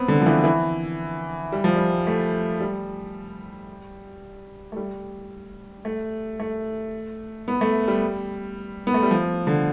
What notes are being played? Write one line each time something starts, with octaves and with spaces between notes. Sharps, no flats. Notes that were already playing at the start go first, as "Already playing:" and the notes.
Already playing: B3 C4
D3
F3
E3
E3
G3
F3
G3
A3
G3
A3
G3
A3
A3
B3
A3
G3
B3
A3
G3
F3
D3